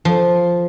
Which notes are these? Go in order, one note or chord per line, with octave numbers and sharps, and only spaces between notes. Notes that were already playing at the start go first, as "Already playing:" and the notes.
F3